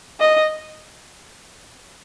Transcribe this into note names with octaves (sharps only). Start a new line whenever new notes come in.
D#5